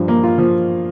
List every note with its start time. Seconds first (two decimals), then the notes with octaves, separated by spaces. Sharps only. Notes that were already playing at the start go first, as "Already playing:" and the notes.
Already playing: G2 F3
0.08 A#3
0.24 F4
0.38 F3